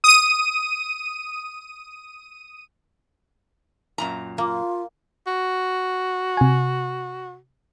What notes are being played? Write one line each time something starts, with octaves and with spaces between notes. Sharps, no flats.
D#6 D#7
F#2 A#2 A#5
A#3 F4
F#4
C3 G#5